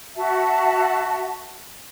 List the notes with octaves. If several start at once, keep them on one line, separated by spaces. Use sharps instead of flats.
F#4 E5 A5